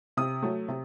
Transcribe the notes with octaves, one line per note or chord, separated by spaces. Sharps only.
C3 D#6
F#3 A3
C3